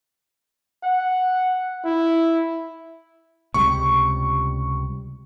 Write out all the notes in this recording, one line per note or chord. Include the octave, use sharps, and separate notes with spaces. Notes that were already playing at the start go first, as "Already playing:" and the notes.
F#5
E4
C#2 C3 G3 C#6